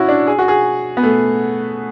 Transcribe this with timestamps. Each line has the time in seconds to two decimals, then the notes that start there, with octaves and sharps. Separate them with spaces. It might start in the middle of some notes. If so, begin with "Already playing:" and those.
Already playing: C#4 E4 F#4
0.09 D4
0.27 G#4
0.38 F#4
0.48 G#4
0.97 B3
1.03 A3